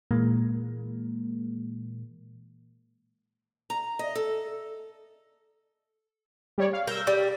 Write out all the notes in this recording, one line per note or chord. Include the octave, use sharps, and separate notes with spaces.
A#2 E3 G#3 A#3
A#5
D#5
A4
G3 C#5 D5
F5
A#4 E6 G6
G3